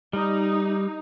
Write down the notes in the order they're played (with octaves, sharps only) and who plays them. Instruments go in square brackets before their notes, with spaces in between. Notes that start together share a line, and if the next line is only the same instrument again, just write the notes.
[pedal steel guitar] G3 [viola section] D#4